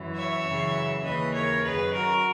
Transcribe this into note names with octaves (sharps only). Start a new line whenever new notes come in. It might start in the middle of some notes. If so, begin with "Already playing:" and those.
Already playing: F#2 E3
C#5 E5
F#2 C#3 E3
D#2 C#3 E3 B4 D#5
A#4 C#5
F#2 D#3 G#4 B4
F#4 A#4